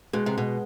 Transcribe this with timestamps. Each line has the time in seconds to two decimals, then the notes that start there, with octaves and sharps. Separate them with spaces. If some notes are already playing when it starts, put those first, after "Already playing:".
0.13 B2 G#3
0.26 C3
0.38 B2